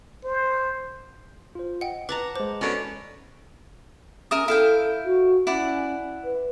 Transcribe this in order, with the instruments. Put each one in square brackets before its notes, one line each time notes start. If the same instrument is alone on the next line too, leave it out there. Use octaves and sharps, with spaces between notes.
[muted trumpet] C5
[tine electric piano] F4 C5
[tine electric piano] D#5 [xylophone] F#5 G5
[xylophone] B4 [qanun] F#5 A5 A#5 [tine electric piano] D6
[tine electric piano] G#3 D6 [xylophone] C5
[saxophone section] B2 D3 [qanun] C#4 C#5
[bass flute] C#4 [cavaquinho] A#4 E5 D#6
[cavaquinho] E4 F5 G5 [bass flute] A4
[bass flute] F#4
[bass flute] C#4 [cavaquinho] E4 D5 F#5
[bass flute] B4